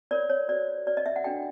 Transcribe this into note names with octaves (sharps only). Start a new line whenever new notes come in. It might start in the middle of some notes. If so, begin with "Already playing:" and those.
F4 A#4 C#5 D5
C#5
F#4 A4 C5 D5
F#4 B4 D5
D#5
E5
F#5
D4 F#4 A4 G5